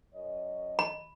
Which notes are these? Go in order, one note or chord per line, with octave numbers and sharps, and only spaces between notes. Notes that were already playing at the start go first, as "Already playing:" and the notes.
F#2 C#5 D#5
B5